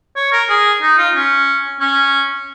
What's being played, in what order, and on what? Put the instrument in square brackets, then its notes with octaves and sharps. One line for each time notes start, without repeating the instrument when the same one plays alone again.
[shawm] C#5
A#4
G#4
D#4
F4
C#4
C#4